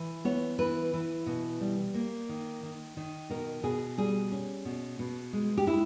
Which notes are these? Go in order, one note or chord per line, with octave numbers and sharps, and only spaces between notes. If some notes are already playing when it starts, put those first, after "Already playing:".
Already playing: E3
B3 C#5
E3 B4
E3
B2
G3
A#3
D#3
D#3
D#3
B2 A#4
B2 G#4
G3 G#4
C#4
B2
B2
G#3
G4
G#3 E4